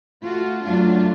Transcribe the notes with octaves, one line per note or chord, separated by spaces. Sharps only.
A3 F4 F#4
F#2 F#3 A3 D4 F4